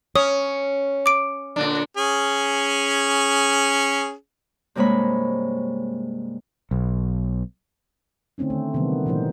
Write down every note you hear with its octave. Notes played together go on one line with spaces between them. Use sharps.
C#4 C#5 D#6
D6 D7
A#2 D3 D4
C#4 G#4
G2 C3 G#3 A#3 C#5 B5
B1
D3 A3 C4 C#4 D#4
D3 D#3 A3
C3 D#3 E3 F#3 G3 B3
A#2 E3 F3 A3 D#4 C5